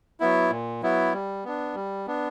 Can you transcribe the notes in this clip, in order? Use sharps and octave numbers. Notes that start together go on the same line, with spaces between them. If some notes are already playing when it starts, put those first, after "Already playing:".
F#3 B3 E4
A#2
F#3 B3 E4
G3
B3 D4
G3
B3 D4